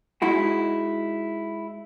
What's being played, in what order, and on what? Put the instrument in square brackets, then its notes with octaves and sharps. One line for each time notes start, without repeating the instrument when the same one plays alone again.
[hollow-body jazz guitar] G#3 D#4 E4 F#4